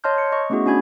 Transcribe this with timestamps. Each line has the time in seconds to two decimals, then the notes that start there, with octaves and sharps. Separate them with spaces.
0.04 C#5 D#5 A5 C6 F6 G6
0.18 C#7
0.32 D#5 C#6
0.50 A3 B3 C#4 E4 F#4 G#4
0.66 C#4 D4 F#4 G#5 B5 G#6